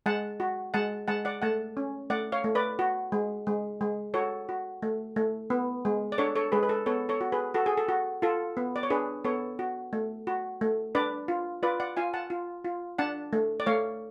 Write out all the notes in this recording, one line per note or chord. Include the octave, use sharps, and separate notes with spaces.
G#3 F#5 A5
F#4
G#3 F#5 A5
G#3 F#5 A5
D5 F#5
A3 F#5 A5
C#4
A3 D5 F#5
C#5 F5
A3
B4 D5
F#4
G#3
G#3
G#3
F#4 A4 C#5
F#4
A3
A3
B3
G#3
D5
D4 A4 C#5
A4 C#5
G#3 G#4 B4
B4
A4
B3 A4 C#5
A4 C#5
F#4
G#4 B4
F#4 A4
G#4
A4
F#4
F4 A4
B3
D5
C#5
D4 G#4 B4
B3 A4 C#5
F#4
A3
F#4
A3
D4 B4 D5
F4
F4 B4 D5
D5 F#5
F4 F5 G#5
F#5 A5
F4
F4
D4 F#5 A5
A3
D5
A3 C#5 F5